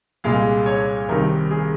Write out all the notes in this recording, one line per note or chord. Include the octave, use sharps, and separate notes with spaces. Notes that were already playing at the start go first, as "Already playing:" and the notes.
C2 A#2 G#3 F5
C#5
C2 C3 D#3 A#4
G#4